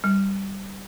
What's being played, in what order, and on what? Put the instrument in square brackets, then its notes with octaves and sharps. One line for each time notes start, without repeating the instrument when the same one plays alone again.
[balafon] G3